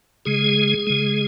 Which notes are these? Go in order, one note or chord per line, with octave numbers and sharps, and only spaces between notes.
C#3 G#3 G#4
C#3 G#3